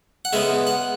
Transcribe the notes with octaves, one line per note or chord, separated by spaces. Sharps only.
F#5
C#3 G#3 B3 E5
F#5